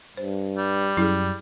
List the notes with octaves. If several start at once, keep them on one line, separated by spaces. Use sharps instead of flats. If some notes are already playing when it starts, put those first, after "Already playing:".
G2 C5
G3
F#2 E4 G#4